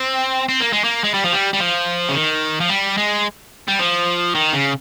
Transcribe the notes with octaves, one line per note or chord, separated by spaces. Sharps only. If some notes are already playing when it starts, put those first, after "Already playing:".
Already playing: C4
C4
A#3
G#3
A#3
G#3
G3
F3
G3
G3
F3
C#3
D#3
F3
G3
G#3
G3
F3
D#3
C#3